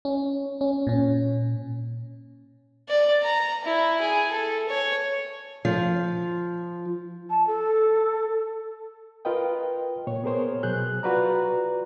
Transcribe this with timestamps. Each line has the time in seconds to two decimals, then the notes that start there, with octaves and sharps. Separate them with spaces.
0.05 C#4
0.61 C#4
0.87 A#2 C#4
2.89 D5
3.23 A#5
3.65 E4
4.01 G#4
4.32 A4
4.69 C#5
5.65 F3
7.30 A5
7.47 A4
9.25 F4 A#4 B4 D#5 G5
10.07 A#2 C#5
10.24 B3 G#4 A#4 C5 C#5
10.63 B2 F#3 G#4 F#6 G6
11.03 F4 F#4 B4 D5 A#5